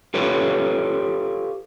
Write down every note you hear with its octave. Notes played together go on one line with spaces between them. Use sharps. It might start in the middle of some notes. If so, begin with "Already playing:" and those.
F4 G4 A4 B4 C#5